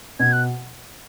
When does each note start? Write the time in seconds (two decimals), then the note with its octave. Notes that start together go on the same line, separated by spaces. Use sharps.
0.20 B2 G#6
0.33 F#6